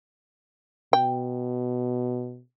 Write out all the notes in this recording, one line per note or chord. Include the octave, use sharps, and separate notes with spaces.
B2 G5